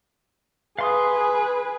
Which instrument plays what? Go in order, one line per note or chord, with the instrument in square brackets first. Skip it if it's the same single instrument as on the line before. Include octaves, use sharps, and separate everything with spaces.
[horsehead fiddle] G#4 B4 [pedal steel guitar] F5 C6 D#6